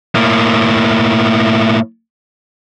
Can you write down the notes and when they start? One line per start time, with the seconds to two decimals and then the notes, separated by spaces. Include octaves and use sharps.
0.15 A2 A#3